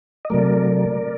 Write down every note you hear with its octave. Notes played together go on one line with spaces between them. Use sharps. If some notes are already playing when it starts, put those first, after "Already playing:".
D#5
C3 F#3 A3 A#4 D5